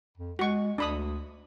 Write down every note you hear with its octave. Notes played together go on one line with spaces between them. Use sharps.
F2
G#3 F#4 C#6
D2 D4 B5 D#6